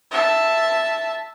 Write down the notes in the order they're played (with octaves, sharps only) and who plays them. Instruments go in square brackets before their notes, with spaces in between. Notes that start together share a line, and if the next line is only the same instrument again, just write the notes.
[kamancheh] E5 A5